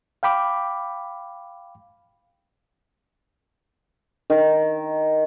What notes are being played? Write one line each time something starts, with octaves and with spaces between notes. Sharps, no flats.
F5 G5 B5 D6
D#3